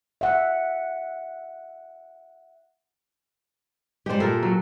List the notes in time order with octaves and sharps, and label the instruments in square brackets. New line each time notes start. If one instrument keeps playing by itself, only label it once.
[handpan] E5 F#5
[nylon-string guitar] G3 G#3 [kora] G4 C5
[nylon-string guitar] A#2 [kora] A4 A#4
[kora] F#3